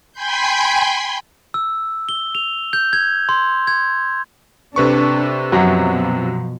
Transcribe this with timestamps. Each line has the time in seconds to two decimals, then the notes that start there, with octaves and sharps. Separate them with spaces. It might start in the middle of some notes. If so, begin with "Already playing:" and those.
0.13 G5 G#5 B5 C6 G6
1.54 E6
2.09 G7
2.35 F7
2.73 G6
2.93 G#6
3.29 C6
3.67 G#6
4.76 C3 D4 A4 B4 C#6
5.52 F#2 B2 F3 F#3